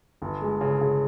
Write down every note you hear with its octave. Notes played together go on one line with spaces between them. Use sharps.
G1
G#3
C#3
C#3